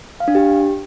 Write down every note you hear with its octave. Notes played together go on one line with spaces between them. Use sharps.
F5
D4
G4